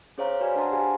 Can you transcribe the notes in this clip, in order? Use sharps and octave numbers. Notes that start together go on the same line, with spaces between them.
C#4 G#4 C5 C#5 F5 A#5
F#4 B4 C5 D5 G#5
D4 C5 F#5 A5 A#5 C6
G4 G#4 F5 G#5